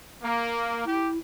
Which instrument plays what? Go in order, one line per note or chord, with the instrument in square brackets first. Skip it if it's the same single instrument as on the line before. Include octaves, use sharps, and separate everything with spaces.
[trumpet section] A#3
[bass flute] E4 [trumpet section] G4